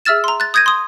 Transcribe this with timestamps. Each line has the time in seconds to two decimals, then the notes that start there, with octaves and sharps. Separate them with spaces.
0.05 G#4 E5 E6 F6 A6 E7
0.24 A#5 C6
0.40 F#6 A6
0.54 D#6 G6 G#6 A#6 D#7
0.66 C6 D#6